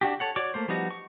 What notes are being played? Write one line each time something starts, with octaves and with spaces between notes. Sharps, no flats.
D4 F#4 G4
A4 C#5 F#5
F#4 C#5 D5 C#6 D6
A3 A#3 C5
F3 G3 B3 D#4 F#4
C#6